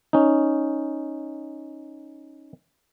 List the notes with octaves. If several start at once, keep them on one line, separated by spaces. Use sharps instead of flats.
C#4 D#4